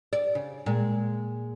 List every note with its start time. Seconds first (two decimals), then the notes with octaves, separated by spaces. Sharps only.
0.13 D5
0.35 C#3
0.66 A#2 G#3